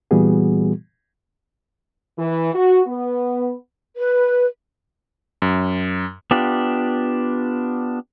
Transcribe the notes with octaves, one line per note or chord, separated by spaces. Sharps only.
A#2 E3 G3 B3 F#4 G#4
E3
F#4
B3
B4
F#2
B3 D4 F4 G4